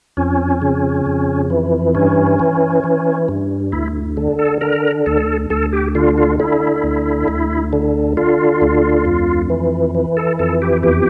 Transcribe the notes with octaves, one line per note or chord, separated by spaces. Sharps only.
F2 C#4
C#3
F2
E3
G2 C#4
E3
E3
G2
D2 E4
D3
A4
D3 A#4
D2 A4
D2 A4
G4
D3 F4
F4
D3 E4
D2
D2
D3
D3 F4
D2
F2
E3
E3
A4
F2 A4
G4
E2 G4